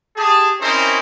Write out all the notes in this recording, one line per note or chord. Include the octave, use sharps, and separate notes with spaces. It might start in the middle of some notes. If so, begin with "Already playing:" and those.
G4 G#4 A5
C4 C#4 D#4 E4 A#4 C5